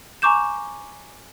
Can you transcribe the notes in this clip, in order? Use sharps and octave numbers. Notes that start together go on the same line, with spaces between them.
G#5 A#5 C#6 D6 G6 E7